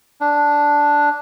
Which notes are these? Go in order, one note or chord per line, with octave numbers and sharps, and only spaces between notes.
D4